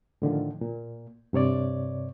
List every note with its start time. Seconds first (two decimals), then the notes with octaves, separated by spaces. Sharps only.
0.22 A2 D3 D#3 F3
0.61 A#2
1.33 G2 C3 C#5 D5